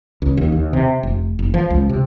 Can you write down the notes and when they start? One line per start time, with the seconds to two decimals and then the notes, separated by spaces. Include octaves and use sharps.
0.22 C#2
0.37 D#2
0.52 D#2
0.73 C3
1.03 F1
1.39 F#1
1.54 F3
1.70 C#2
1.89 C3